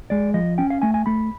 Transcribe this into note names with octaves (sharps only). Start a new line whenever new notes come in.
G#3 D5
F3 D#5
C#4 G5
F5
A3 G#5
G#5
A3 B5